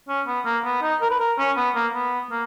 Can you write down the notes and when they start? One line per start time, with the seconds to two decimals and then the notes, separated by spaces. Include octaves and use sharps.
0.09 C#4
0.27 B3
0.46 A#3
0.65 B3
0.82 D#4
1.01 A#4
1.11 B4
1.20 A#4
1.39 C#4
1.57 B3
1.75 A#3
1.93 B3
2.31 A#3